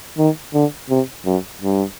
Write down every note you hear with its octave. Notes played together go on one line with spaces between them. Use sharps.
D#3
D3
C3
F#2
G2